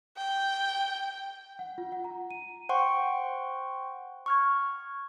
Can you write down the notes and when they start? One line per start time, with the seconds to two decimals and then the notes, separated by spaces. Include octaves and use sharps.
0.17 G5
1.59 F#5
1.78 F4
1.92 F#5
2.04 A#5
2.31 D#7
2.69 C5 F#5 G5 C6 C#6
4.26 C#6 F6 G#6